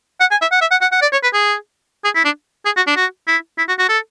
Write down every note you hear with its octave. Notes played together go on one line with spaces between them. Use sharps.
F#5
G#5
E5
F#5
E5
F#5
F#5
F#5
D5
C#5
B4
G#4
G#4
E4
D4
G#4
F#4
D4
F#4
E4
E4
F#4
F#4
A4